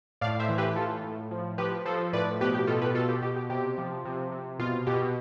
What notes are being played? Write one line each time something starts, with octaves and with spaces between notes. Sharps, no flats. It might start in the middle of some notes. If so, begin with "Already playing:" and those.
A2 D5 F5
C5 E5
E3
G4 B4
A2 F4 A4
A2
F3
F3 G4 B4
F3 A4 C5
A2 B4 D5
B2 G4 B4
G4
B2 F4 A4
G4 B4
B2 F4 A4
G4
B2 G4
G4
C3 G4
F3
C3
C3
B2 F4
B2 G4